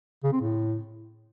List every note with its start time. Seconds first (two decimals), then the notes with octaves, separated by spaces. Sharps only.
0.24 C#3
0.32 C4
0.41 A2